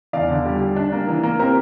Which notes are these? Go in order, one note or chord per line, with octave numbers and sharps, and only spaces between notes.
E2 D5 F5
D3
G3
G3
D4
A#3
E3
A#3
C4 G4 A#4